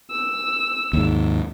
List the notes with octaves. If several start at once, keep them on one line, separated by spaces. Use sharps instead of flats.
E6
D#2 G#2